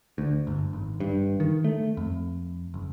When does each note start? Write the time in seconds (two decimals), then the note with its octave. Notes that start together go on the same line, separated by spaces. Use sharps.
0.18 D2
0.47 G1
0.73 G#1
1.00 G2
1.40 D#3
1.64 A3
1.97 F2
2.74 F#1